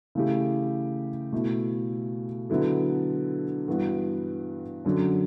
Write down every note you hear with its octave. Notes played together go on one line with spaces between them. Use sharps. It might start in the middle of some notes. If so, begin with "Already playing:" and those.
C#3 E3 A3 E4 G4
B2 A3 E4
D3 F#3 B3 E4 A4
G2 E3 B3 F#4
F#2 D3 F#3 C#4